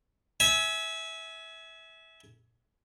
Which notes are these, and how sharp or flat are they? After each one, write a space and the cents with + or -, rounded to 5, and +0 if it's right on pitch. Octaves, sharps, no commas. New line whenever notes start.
E5 -20 G#5 +20